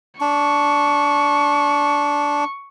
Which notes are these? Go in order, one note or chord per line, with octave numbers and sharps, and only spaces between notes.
D4 C#6